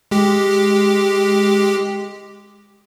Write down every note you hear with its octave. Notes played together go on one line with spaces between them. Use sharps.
G#3 G4